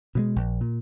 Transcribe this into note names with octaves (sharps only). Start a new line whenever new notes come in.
B2 G3 G#3
A#1
A#2